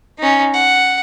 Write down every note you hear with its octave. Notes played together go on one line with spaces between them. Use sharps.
C#4 D#4
F#5